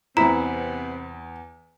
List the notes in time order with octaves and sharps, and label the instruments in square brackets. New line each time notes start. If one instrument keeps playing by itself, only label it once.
[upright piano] E2 B6 [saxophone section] C3 B3 C4 [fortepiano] E4 [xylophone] A#5